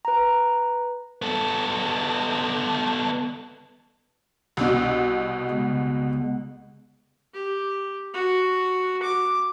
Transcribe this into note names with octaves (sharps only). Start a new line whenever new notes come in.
B4 A#5
B3 A4
C2 B2
C#3 G#3 B3
G4
F#4
D6